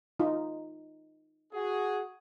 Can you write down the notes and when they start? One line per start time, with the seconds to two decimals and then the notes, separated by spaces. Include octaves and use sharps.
0.19 D#4 F4
1.53 F#4 G#4